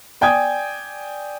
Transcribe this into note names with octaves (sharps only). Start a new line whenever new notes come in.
D5 G5 G#5 D#6 G#6